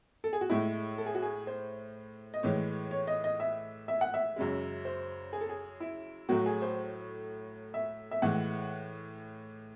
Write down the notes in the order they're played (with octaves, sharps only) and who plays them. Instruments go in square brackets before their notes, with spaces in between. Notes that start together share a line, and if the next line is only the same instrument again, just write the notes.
[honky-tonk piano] A4
G#4
F#4
A2 G#3 E4
A4
G#4
F#4
G#4
C5
D#5
A2 E3 G#3 C#5
C#5
D#5
D#5
E5
E5
F#5
E5
F#2 C#3 G#3
C5
G#4
A4
G#4
E4
A2 F#3 A3 F#4
G#4
C5
E5
E5
A2 E3 G#3 F#5